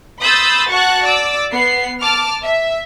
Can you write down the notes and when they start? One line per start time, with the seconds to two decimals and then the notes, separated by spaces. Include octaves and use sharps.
0.21 B5 C6 D#6 E6 G6 A6
0.71 F#4 F#5 A5 C#6 F#6
1.04 D5 D6 E6
1.51 B3 C7
2.01 A5 D6 F6
2.43 E5